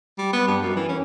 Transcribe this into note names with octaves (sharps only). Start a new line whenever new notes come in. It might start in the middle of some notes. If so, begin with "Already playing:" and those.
G3
B3
G2
F#2
E3
C#4